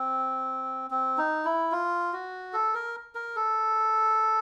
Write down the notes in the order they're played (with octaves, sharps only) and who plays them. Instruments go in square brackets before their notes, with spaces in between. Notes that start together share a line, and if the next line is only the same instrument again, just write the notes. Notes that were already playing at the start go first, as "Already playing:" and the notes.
Already playing: [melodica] C4
C4
D#4
E4
F4
F#4
A4
A#4
A#4
A4